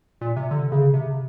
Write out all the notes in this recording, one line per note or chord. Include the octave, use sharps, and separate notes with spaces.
A#2
C3
D3
C#3
C3